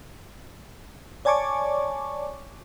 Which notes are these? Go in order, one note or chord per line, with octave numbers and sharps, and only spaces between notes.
C#5 D5 G#5 A5 C#6 D6